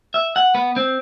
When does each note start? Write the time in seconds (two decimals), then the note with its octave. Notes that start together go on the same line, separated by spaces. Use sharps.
0.14 E5
0.36 F#5
0.55 B3
0.76 C4